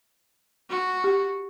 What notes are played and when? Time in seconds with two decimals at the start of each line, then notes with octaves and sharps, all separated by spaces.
0.70 F#4
1.04 G4